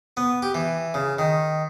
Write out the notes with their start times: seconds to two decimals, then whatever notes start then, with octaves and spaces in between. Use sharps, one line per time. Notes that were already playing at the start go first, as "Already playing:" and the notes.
0.17 B3
0.42 G4
0.54 E3
0.94 C#3
1.19 D#3